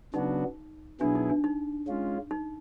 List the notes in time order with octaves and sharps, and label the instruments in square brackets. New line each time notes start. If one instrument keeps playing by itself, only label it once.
[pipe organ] C#3 F#3 B3 D4 F#4 [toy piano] D#4
[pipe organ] B2 F#3 B3 E4 G#4 [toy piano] D4
[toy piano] D#4
D4
D#4
[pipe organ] G#3 C#4 F4
[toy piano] D#4